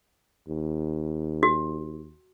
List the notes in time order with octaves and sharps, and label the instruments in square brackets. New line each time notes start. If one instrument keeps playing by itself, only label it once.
[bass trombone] D#2
[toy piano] F#4